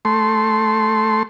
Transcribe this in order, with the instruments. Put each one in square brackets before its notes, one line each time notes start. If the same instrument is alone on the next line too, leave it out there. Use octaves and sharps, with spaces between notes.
[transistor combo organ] A3 C6